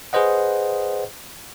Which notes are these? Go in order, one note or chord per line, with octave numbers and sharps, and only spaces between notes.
G#4 B4 C5 D#5 F#5